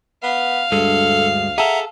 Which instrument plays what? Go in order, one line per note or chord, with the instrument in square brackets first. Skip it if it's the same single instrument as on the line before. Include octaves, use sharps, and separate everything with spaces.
[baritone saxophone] B3 [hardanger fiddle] F5
[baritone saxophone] D2 [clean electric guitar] G2 G#3 [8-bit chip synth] A4
[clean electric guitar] G#4 A4 [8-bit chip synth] E5 F#5 A#5